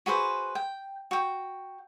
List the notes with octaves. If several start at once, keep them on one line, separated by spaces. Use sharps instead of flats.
F#4 G#4 B4 C5
G5
F#4 G5